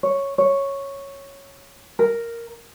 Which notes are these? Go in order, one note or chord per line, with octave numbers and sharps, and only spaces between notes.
C#5
C#5
A#4